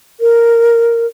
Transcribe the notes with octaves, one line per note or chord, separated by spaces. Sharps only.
A#4